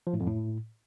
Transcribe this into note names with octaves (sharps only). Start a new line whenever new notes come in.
F3
A2
F2
A2